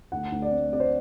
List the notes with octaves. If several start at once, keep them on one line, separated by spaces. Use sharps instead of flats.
D2 F#5
D2
D5
C4
C4 D5
C5